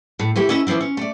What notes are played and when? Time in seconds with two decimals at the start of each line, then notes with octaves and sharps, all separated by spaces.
0.19 A2
0.36 E3 A3 E4 G4
0.49 C#4 E4 D#5
0.67 E3 F3 A3 C4 E4
0.80 C#4
0.97 A3 D5